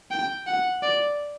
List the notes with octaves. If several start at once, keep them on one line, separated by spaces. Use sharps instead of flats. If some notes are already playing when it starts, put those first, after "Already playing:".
G5
F#5
D5